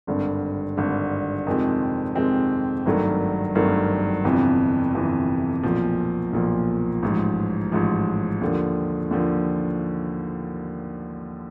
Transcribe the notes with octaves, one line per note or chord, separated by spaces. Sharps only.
G#1 G2 D3
G#1 G2 D3
F2 C3 D#3 G#3 C4
F2 C3 D#3 G#3 C4
G#1 G2 D#3 F#3 A3
G#1 G2 D#3 F#3 A3
G1 F2 C3 E3
G1 F2 C3 E3
B1 A#2 F3
B1 A#2 F3
A1 G#2 F3
A1 G#2 F3
D#2 D3 F3
D#2 D3 F3